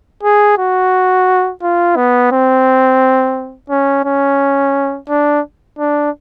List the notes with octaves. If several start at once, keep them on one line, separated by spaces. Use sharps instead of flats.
G#4
F#4
F4
B3
C4
C#4
C#4
D4
D4